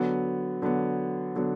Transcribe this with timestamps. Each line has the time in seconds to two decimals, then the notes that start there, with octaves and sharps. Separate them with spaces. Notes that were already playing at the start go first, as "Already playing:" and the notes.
Already playing: D3 F#3 B3
0.62 D3 F#3 B3
1.36 D3 F#3 B3